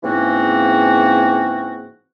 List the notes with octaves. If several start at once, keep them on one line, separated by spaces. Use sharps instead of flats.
G#2 C#3 E3 A#3 C4 F#4